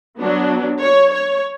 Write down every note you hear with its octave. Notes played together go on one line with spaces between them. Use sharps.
F#3 B3 D4
C#5
C#5